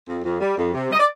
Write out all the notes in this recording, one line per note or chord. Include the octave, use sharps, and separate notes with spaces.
F2
F2
G3
F2
C3
G3 D#5
D5